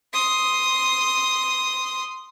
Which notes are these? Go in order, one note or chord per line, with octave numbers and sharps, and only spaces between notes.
C6 D#6